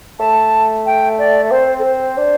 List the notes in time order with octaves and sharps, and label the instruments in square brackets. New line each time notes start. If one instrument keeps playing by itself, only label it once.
[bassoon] A3 [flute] A5
[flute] G5
D5
[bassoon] C4 [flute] C5
[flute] A4
C5
[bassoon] D4